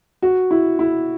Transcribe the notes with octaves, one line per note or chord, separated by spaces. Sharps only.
F#4
E4
E4